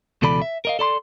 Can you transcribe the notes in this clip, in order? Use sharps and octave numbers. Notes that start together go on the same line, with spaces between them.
C#2 B2 E3 A4 D5 B5
E5
A#4 D#5 F5
A4 D5 B5 C6